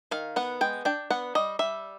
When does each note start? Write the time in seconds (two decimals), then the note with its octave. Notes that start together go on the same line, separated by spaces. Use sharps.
0.11 D#3 F5
0.36 B3 F#5
0.61 G#3 G5
0.85 D4 G5
1.10 B3 F#5
1.35 G3 D#5
1.59 G3 E5